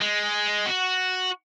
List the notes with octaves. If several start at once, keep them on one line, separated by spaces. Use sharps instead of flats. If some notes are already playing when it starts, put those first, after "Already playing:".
G#3
F#4